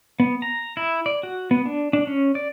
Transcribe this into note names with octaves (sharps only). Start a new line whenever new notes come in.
B3
A#5
E4
D5
F#4
B3
D4
D4
C#4
D5